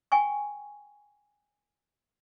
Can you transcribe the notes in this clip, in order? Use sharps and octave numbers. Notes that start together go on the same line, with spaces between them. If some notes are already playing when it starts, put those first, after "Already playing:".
G5 G#5 C#6